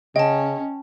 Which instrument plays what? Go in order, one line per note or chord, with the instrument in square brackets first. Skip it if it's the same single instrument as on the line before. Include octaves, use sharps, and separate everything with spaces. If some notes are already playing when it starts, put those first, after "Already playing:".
[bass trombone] C#3 [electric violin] C#4 [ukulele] D#5 [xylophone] G5 A5